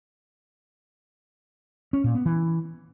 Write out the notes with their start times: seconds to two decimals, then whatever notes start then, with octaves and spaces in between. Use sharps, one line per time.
1.93 C#4
2.04 A#2
2.15 B3
2.26 E3